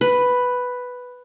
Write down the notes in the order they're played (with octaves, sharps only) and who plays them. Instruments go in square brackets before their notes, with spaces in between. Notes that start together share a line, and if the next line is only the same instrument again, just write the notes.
[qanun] B4